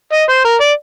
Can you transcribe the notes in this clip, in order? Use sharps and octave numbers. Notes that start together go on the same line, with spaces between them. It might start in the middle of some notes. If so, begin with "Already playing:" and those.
D#5
C5
A#4
D5